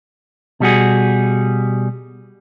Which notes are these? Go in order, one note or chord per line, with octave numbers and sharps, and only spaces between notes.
B2 G3 F#4 G#4